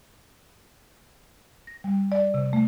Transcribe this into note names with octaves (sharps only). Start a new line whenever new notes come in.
A#6
G3
D5
C3
A3